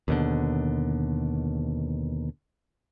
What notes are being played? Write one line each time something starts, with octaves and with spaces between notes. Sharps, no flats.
D#2 B2 D3